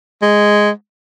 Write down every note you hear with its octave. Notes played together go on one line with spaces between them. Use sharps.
G#3